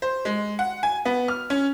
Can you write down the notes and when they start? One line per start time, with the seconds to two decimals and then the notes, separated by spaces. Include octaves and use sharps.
0.02 C5
0.25 G#3
0.59 F#5
0.83 G#5
1.05 B3
1.28 F6
1.50 C#4